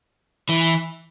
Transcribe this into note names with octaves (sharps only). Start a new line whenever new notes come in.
E3